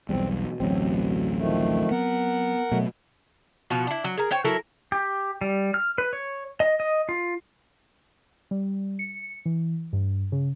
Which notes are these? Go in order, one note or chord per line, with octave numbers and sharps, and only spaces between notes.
B1 E2 G3 C4
B2
A1 D2 F#3 C4
D#3 F3 A3
B3 A#4 F#5
B2 F#3 A3
B2 F3 F#4
D4 E4
F#3
G#4 A#4
C5 C#5 G5
F#3 E4 A4 A#4
G4
G3
F6
B4
C#5
D#5
D#5
F4
G3
C#7
E3
G2
C#3